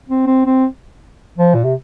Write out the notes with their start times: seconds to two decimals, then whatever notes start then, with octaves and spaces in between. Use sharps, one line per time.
0.09 C4
0.27 C4
0.46 C4
1.38 F3
1.54 A#2
1.64 C3